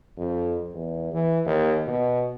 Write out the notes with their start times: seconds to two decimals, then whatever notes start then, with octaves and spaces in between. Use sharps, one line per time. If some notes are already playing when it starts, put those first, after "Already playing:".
0.17 F2
0.74 E2
1.13 E3
1.45 D#2
1.87 B2